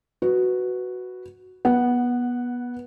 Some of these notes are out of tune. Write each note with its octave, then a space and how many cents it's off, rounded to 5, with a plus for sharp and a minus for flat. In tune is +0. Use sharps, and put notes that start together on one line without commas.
F#4 +0 B4 +0
B3 -20 F#5 +0